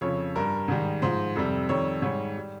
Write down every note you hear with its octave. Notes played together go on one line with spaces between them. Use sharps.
F2 C#3 F3 C#5
G2 G3 A#4
G#2 D#3 G3
G#2 F3 C5
F2 C3 G3
F2 D#3 G3 C#5
G#2 G3 C#5
G3